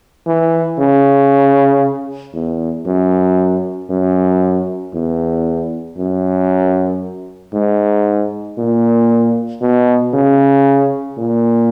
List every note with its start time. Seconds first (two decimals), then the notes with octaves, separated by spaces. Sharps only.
0.27 E3
0.79 C#3
2.34 E2
2.87 F#2
3.90 F#2
4.94 E2
5.98 F#2
7.54 G#2
8.58 A#2
9.61 B2
10.14 C#3
11.18 A#2